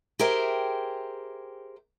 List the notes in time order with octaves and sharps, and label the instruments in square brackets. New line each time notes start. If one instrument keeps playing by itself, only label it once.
[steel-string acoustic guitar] G4 G#4 A#4 C5 E5 G5